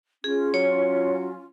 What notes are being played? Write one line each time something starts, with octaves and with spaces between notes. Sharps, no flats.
C#4 F4 G#4
F#3 C#5